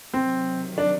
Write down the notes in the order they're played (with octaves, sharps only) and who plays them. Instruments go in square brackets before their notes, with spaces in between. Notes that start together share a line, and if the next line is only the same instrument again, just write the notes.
[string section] C3 D#3 F#3 [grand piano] C4
[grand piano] D4